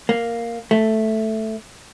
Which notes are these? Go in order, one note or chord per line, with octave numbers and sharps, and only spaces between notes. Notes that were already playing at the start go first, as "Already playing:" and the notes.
A#3
A3